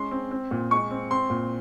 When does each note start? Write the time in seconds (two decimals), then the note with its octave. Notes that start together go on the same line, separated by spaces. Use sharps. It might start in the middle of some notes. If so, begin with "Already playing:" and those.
Already playing: G#3 C#4 C6
0.11 C4
0.31 C4
0.51 A#2
0.71 G#3 C#6
0.91 C4
1.11 C4 C6
1.30 A#2